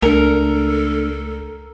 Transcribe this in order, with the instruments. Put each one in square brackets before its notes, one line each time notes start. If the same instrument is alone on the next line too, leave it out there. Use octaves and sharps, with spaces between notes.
[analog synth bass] C#2 [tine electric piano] A3 D4 [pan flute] A4 [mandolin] A#4